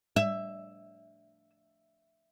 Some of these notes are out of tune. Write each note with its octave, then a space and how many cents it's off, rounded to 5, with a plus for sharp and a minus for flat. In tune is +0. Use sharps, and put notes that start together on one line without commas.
E5 +5